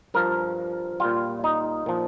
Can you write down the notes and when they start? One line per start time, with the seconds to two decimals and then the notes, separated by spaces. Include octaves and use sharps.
0.14 G2 F3 A#4
1.00 A#2 G3 F4
1.44 D#4
1.86 A#2 F3